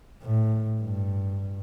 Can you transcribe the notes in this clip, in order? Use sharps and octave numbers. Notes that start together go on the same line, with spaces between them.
A2
G2